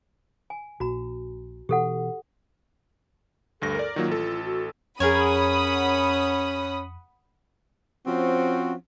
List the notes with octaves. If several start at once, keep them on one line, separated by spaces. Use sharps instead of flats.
G#5
A#1 F#4 A#5
B2 E3 G4 A4 F#5
D2 G2 A4 A#6
A#4 D5
D#3 F#3 A#3 F4
A1 A4
F#4
F2 C#4 G#4 A#4 C#5 F#5 B5 D#6
F3 C4 C#4 F#4